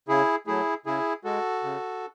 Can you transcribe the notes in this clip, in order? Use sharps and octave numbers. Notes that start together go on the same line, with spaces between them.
C#3 E4 G#4
F#3 A3 E4 G#4
C#3 E4 G#4
G#3 F#4 A4
C#3